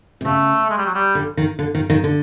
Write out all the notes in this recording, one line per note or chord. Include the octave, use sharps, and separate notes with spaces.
C3
C#3 A3
G#3
G3
F#3
G3
D3
D#3
D3
D#3
D#3
D3